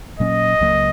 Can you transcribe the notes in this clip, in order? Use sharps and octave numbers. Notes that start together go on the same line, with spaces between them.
A#2 F#3 A#3 C#4 D#5
C#2 C#3 F#3 A#3